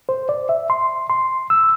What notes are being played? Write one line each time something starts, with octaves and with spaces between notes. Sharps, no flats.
C5
D5
E5
C6
C6
E6